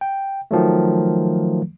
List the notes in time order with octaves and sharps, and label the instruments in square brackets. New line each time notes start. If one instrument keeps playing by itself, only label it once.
[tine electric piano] G5
D#3 F3 F#3 A3